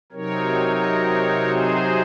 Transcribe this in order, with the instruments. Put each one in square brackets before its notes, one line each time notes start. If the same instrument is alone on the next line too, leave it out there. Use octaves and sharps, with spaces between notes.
[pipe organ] C3 F#3 C4 D#4 A#4 C#5
G#4 C5